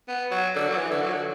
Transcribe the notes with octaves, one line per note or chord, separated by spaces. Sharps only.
B3
F#3
D3
F#3
E3
D3
F#3
D3